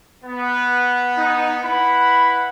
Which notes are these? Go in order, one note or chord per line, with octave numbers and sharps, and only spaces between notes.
B3
D#4
E4 B4 F#5 B5